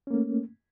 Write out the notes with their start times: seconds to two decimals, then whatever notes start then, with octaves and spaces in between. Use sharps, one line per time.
0.07 C#4
0.11 A#3
0.14 A3